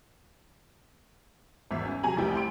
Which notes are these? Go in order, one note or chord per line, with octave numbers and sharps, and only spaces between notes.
G#1 E2 E5
C#4
C3 F#3 G#4 G#5 A#5 F#7
F1 C2 E4 G4 G5
C6 D7